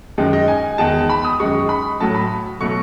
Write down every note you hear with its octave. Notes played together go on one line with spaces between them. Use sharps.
F#2 D#3 G#3
D#5
G#5
E2 D#3 G#3 A5
B5
D#6
F#2 D#3 G#3 C#6
B5
A2 F#3 A3 A5
B5
B2 F#3 A3 C#6